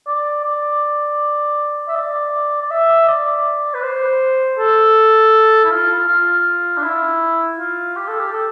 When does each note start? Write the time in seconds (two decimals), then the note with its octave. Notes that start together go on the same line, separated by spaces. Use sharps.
0.07 D5
0.44 D5
1.88 E5
1.95 D5
2.62 D5
2.71 E5
3.08 D5
3.74 B4
3.82 C5
4.58 A4
5.64 E4
5.70 F4
6.08 F4
6.77 D4
6.83 E4
7.59 F4
7.96 G4
8.08 A4
8.20 G4
8.32 A4